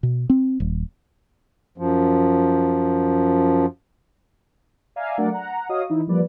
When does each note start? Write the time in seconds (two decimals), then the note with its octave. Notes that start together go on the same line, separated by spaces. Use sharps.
0.03 B2
0.30 C4
0.60 D#1
1.78 F#2 F3
4.96 D5 E5 F5 G#5 A#5
5.18 F#3 A3 D4 A#4 D5 F#5
5.32 F#5 A#5
5.69 F#4 C#5 D#5 F5 D#6
5.90 E3 D#4 E4
6.08 F3 G3 A#3 B4 D5